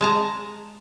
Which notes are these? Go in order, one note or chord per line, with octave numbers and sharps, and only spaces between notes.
G#3 A5 A#5